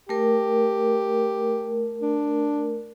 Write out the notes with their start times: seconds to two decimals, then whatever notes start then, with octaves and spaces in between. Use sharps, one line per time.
0.09 A3 G4 A#4
2.02 D4